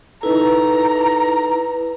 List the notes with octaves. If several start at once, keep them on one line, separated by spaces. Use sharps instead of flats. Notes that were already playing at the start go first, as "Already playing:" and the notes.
D#4 E4 A4 B4 A#5